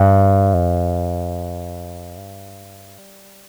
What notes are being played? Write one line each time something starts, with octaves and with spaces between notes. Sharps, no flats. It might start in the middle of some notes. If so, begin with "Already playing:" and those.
Already playing: G2
F2
G2
G3